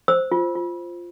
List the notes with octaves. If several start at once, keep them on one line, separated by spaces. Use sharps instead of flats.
C5 E6
F4
F4